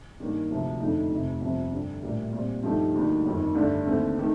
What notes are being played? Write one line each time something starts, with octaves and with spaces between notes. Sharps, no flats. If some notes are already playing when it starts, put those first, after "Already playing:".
G2 D#3 A#3
D2 C3 F3
F2 D3 A3 D#4
F1 F2 C3
G1 F2 C3 F3 C4
G2 D3 G3
A#1 A2 G3 A#3
A#2 G3 C4 F4
G2 F3 A3 D#4 G4
D2 D3 G3 A#3 D#4
G1 F2 D#3
G2 D3 A3 D4
D#2 D3 A3 C4
D#3 A3